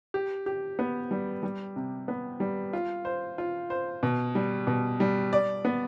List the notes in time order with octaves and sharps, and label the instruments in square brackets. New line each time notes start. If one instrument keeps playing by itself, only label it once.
[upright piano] G4
G4
B3
G3
G3
C3
B3
G3
F4
C5
F4
C5
B2
G3
B2
G3
D5
B3